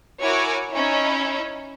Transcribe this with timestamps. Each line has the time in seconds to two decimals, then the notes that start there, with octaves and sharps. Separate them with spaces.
0.21 E4 F#4 A#4 C#5 G#5 D6
0.71 C#4 D#4 E4 C#5